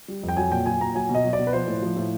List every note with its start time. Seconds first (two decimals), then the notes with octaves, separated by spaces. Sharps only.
0.08 G3
0.23 F2
0.29 G5
0.37 F#3 G#5
0.51 A#2 G5
0.66 F#3 G#5
0.80 A#2 A#5
0.95 F#3 G#5
1.09 B2
1.14 D#5
1.25 F#3
1.33 D5
1.39 B2
1.47 B4
1.53 F3 C5
1.67 A2
1.83 F3
1.97 A2